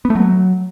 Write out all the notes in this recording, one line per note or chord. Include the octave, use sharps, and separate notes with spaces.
B3
A3
F#3